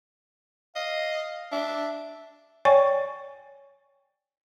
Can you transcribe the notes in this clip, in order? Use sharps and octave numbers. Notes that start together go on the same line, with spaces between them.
D#5 F5
D4 E5
C#5 D5 G5 G#5 C#6